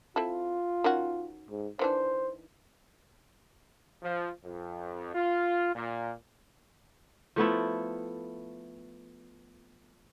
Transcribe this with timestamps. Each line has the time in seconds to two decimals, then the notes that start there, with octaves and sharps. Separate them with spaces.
0.16 C4 E4 F4 A4
0.84 D#3 C#4 F#4
1.50 G#2
1.79 D#3 E3 D4 C5
4.03 F3
4.44 F2
5.14 F4
5.75 A#2
7.36 F3 A3 B3 E4